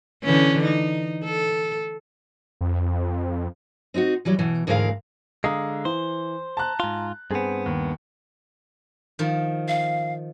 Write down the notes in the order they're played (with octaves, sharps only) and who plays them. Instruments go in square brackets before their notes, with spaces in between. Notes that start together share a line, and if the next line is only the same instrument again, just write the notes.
[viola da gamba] D3 E3 C#4
D#4
A4
[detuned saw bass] F2
[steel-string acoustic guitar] C4 D#4 F4 F#4
E3 F#3 G3
B2 E3
D2 G#2 E3 G#3 A#4 F5
[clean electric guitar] D3 G#3 [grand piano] F5 A#5 D#6
[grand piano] E3 [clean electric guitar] C5
[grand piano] A5 A#5 F#6
[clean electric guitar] G#2 F4
[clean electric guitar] G2 B3 [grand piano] C4 G#4
[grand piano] D#2
[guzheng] D#3 F3 D#4
[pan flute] F5